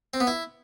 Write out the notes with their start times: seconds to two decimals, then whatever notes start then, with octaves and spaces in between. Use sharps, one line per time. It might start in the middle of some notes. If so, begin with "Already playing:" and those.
0.14 C4
0.20 B3
0.27 E4